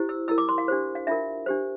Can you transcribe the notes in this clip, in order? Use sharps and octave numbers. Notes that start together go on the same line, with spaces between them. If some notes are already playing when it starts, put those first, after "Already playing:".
Already playing: E4 G4 C5
E6
E4 A#4 E6
D6
C6
F5
D4 G4 C5
F5
D4 F4 A#4 E5
D4 G4 C5